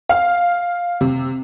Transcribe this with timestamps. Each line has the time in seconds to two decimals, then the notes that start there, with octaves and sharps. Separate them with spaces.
0.09 F5
1.01 C3